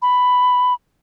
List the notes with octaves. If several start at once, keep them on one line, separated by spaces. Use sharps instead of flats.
B5